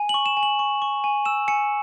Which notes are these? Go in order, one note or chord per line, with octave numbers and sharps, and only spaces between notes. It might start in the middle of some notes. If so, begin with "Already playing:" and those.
Already playing: G#5
C#6 F#7
E7
G#5
F#7
C#6
C#6
G#5
E6 E7
G#5 C#7